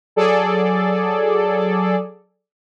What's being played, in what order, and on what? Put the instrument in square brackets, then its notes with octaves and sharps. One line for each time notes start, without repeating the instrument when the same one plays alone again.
[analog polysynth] F#3 G#4 A4 D5